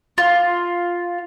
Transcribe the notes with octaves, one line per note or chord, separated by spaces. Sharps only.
F4